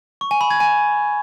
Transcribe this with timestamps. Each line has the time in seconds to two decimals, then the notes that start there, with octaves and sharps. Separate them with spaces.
0.21 C#6
0.31 G#5
0.41 B5
0.51 G#6
0.60 G#5